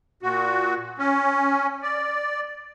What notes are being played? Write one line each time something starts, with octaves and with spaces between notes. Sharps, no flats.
A#2 F#4
C#4
D5